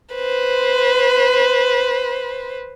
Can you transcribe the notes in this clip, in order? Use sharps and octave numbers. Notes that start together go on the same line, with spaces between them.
B4 C5